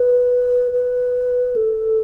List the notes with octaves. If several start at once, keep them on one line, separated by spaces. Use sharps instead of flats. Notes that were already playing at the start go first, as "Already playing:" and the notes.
Already playing: B4
B4
A4